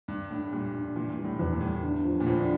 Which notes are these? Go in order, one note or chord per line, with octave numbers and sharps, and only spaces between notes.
G2 G3
A2 D4
A#2 G3
D4
A#2 E3
A#2
G3
A2
E2 G2
A#2
A2 G3
D3
F3
A#2
A2 F3
D3